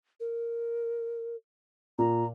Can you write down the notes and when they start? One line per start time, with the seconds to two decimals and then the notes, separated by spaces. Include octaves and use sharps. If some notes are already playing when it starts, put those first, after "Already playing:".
0.20 A#4
1.99 A#2 A#5